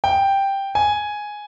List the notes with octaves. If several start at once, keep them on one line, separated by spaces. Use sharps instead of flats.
G5
G#5